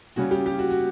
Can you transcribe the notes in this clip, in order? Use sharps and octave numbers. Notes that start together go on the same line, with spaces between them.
C#3 G3 C#4 F#4
G4
G4
F#4
F#4